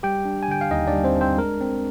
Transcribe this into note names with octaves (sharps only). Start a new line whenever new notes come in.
G3 G4 G5
D4
G#5
D3 G5
F5
D#2 D#4 D#5
D4 D5
G3
C4 C5
D4
C4 C5
G#3 A#4
C4